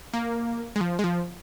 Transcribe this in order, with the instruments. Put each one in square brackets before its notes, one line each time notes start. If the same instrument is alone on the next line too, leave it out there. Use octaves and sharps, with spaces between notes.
[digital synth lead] A#3
G#3
F3
G#3
F3